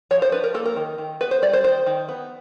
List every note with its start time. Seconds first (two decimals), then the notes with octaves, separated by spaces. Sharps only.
0.11 F3 C#5
0.22 C5
0.32 D4 B4
0.44 A#4
0.54 A#3 A4
0.66 A#4
0.76 D#3
0.98 D#3
1.21 B3 B4
1.31 C5
1.42 G3 D5
1.53 C5
1.64 D#3 C5
1.86 D#3
2.09 B3